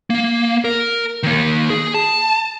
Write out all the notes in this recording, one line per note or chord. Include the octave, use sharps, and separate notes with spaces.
A#3
A#4
D#3 A#3
G#4
A5